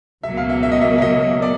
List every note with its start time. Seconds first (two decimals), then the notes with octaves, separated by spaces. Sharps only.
0.23 C#2 B2 F#3 A#3 E5
0.37 F5
0.49 E5
0.63 E5
0.72 D#5
0.81 E5
0.98 E5
1.02 D#5
1.42 D5